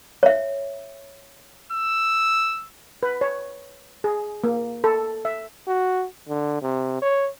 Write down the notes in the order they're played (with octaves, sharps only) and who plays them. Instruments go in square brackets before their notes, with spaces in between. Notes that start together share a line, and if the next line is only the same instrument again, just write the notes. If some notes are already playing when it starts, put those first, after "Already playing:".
[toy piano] C#5 E5
[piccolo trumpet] E6
[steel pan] B4
C#5
G#4
A#3
A4
E5
[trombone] F#4
D3
C3
C#5